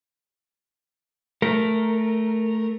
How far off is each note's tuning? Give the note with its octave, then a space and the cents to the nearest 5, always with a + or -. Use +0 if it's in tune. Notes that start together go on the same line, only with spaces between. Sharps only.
A3 +0 A#4 +0